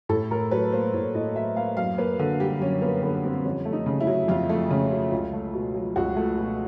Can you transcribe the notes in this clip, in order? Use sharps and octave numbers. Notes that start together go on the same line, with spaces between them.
A2 A4
A2 A#4
F#3 B4
A#3 C5
A2 C#5
A2 D#5
F#3 E5
A#3 F5
F#2 F5
A#3 B4
D3
G3 G4
F#2 C#4
A#3 B3
D3 B3
G3 C4
F2 C#4
A3
D#4
C#3
E4
F#3
F2 F4
A3
C#3
F#3
C#2
A3
B2
F#3
C#2 F#4
A3
B2